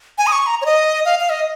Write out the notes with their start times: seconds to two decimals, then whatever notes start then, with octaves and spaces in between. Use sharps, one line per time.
0.18 G#5
0.27 D#6
0.32 C#6
0.47 A#5
0.62 C#5
0.66 D#5
1.05 F5
1.19 F5
1.30 D#5